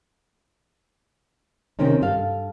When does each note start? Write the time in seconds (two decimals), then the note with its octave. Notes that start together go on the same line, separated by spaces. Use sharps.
1.79 C3 D#3 C4 C#4 D#4
2.01 G2 A4 F5